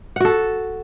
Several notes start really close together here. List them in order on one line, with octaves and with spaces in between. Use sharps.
F#5 F#4 A4